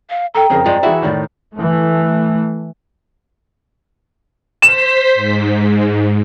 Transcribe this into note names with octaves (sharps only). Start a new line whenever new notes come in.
F5
A4 G5 A#5
F2 C#3 G#4 A#4
G2 F3 G#3 C4 D5
E3 E4 F#4 G#4 E5
A2 D#3 D5
E3 A3
C5 B6 E7
G#2